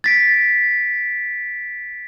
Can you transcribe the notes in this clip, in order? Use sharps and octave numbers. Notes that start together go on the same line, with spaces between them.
A6 B6 D7